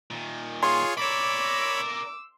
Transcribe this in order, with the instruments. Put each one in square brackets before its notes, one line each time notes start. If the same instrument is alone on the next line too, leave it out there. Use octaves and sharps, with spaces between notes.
[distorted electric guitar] A#2 D#3
[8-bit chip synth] F4 G#4 C#5 [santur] C6
[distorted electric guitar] A#4 D5 [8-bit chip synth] C#5 B5 [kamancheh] D6 E6